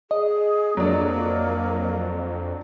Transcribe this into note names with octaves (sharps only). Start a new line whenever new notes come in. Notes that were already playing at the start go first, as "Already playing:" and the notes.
G#4 D#5
F2 F#3 A#3 D4